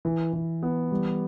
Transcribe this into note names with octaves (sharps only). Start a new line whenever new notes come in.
E3
E3
B3
G3